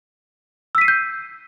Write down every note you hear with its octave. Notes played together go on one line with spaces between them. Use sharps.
E6 G6 B6 C7 D#7